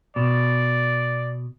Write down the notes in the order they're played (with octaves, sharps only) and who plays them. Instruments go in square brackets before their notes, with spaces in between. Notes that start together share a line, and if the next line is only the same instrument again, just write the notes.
[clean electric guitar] B2 [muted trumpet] D5